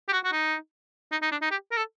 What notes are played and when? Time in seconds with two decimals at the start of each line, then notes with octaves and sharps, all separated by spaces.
0.09 G4
0.13 F#4
0.24 F#4
0.32 D#4
1.12 D#4
1.22 D#4
1.32 D4
1.42 D#4
1.51 G4
1.72 A#4
1.77 A4